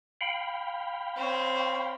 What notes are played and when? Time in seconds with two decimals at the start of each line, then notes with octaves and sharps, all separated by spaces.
0.21 F5 G5 B5
1.17 C4 C#5